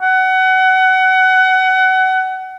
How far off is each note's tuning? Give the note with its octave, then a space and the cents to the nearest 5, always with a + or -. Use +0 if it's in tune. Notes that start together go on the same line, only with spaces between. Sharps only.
F#5 +25